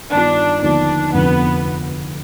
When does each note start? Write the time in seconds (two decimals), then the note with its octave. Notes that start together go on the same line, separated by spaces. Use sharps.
0.12 G2 D#3 B3 D4 F4
0.62 D#2 D3 F3 B3 D4
1.13 F1 F2 D3 F3 B3